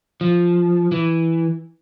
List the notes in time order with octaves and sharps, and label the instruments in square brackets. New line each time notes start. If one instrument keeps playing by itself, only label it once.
[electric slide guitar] F3
E3